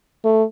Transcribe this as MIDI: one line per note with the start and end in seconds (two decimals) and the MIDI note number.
0.24 0.44 57